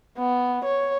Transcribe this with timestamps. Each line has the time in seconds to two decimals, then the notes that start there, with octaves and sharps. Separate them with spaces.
0.18 B3
0.65 C#5